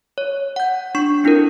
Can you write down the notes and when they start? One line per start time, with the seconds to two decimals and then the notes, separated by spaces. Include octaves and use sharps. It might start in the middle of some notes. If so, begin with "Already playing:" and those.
0.18 C#5
0.56 F#5 G6
0.95 D4 C#6 C7
1.24 C4 D4 E4 A4 A#4